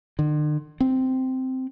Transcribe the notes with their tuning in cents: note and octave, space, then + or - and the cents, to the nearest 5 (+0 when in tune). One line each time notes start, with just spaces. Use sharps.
D3 +45
C4 -10